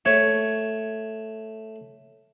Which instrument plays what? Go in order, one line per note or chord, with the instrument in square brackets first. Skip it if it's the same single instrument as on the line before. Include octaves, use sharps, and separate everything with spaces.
[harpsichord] A3 [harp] C#5